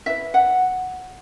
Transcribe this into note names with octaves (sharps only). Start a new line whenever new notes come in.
E4 B4 E5
F#5